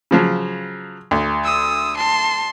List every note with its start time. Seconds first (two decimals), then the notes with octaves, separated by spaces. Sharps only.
0.11 C#3 F3 F#3
1.11 D2
1.44 D#6 E6
1.97 A5 C6